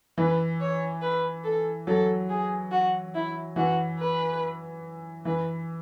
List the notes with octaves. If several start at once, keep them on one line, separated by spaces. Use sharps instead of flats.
E3 B4
C#5
B4
A4
F#3 A4
G#4
F#4
E4
E3 F#4
B4
E3 B4